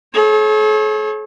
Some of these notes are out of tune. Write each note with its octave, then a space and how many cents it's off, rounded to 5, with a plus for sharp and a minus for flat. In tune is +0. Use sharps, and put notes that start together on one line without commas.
A4 -45 C#5 -30